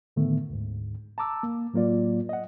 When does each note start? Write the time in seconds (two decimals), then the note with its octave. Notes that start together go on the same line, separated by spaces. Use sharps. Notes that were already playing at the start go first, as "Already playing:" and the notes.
0.16 A2 D3 D#3 A3 B3
0.50 D2 G#2
1.18 A5 A#5 D6 E6
1.43 A#3
1.73 A2 F#3 A#3 F4 D5
2.29 D#5 F#5